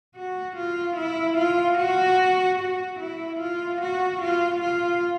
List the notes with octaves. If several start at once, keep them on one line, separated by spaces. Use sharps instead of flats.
F#4
F4
E4
F4
F#4
F#4
E4
F4
F#4
F4
F4